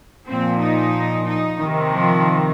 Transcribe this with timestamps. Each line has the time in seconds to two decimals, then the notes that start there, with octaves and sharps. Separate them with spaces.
0.27 A#2 F3 C4
0.60 D#4
1.26 D#4
1.59 C3 D#3
1.92 F3